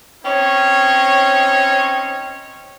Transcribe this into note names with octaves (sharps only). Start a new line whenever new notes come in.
C4 C#4 D#4 C#5